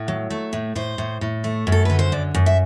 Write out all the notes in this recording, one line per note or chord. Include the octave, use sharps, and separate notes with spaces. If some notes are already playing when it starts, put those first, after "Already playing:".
Already playing: A2
F#3
A3
A2
A2 C5
A2
A2
A3
F#2
A4
D3 B4
C5
F#2 D5
F#2
E5